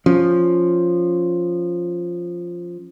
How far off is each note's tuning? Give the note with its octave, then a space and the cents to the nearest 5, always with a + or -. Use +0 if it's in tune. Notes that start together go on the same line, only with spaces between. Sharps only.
F3 +0 C#4 +0